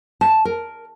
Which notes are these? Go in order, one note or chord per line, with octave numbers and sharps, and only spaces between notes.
A5
A#4